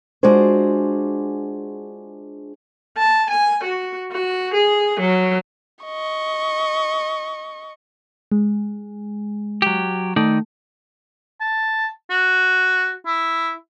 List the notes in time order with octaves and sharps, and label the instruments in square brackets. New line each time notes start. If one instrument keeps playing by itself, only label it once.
[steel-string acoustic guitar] G#3 D4 F4 F#4 G#4 C5
[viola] A5
G#5
F#4
F#4
G#4
F#3
[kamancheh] D#5 C#6
[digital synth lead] G#3
[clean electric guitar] F#3 G4
[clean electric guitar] D#3 D#4 D5 [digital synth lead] A3
[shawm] A5
F#4
E4